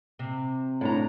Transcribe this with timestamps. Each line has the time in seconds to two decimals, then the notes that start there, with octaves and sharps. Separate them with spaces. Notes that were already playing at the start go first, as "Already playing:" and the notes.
0.19 C3
0.81 A2 D4 A#5